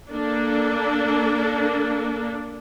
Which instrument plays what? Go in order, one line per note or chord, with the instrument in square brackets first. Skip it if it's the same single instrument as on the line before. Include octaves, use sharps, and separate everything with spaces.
[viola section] A#3 D4 A4